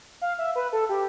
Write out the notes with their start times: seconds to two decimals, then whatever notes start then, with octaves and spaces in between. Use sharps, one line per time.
0.21 F5
0.39 E5
0.55 B4
0.73 A4
0.89 G4